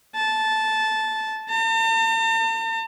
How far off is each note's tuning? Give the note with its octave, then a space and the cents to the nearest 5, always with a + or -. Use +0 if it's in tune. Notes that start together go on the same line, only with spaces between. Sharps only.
A5 -10
A5 +45